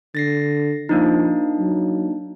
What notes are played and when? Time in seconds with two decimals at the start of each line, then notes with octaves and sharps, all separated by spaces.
0.15 D3 A6 A#6 C7
0.89 F3 A#3 D4 D#4
1.59 F#3